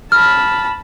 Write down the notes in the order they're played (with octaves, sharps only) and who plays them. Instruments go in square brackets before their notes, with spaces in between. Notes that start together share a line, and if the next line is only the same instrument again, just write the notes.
[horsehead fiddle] A5 B5 [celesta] F6